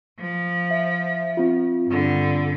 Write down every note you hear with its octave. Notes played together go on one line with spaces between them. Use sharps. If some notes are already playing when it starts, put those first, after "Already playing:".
F3
E5
C4 F4
G2 D3